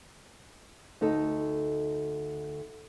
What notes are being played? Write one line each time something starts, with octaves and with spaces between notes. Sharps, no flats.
D2 D#4 A4